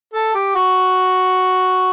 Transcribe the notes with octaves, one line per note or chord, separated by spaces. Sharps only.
A4
G4
F#4